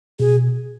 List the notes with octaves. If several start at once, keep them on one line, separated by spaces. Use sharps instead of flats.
B2 G#4